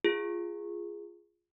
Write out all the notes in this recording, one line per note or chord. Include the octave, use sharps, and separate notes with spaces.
F4 G#4